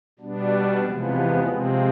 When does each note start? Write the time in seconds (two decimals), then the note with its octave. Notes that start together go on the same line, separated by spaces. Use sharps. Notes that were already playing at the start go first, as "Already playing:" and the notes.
0.19 B2 G3 B3 D4
0.81 E2 C3 F3 G#3 B3
1.44 C3 F3 G#3 C4